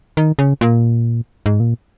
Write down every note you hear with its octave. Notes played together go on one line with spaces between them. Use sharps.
D#3
C#3
A#2
G#2
A#2